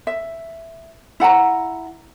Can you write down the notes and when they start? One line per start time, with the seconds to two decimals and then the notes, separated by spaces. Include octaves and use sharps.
0.07 E5
1.20 E4 F#5 A5 A#5